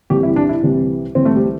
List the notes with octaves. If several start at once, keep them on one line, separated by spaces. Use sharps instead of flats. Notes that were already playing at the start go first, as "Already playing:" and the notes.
C2 C3 E3 G3 G4
E4
D4
E4
C2 C3 E3 G3
C2 C3 E3 G3 C4
A3
G3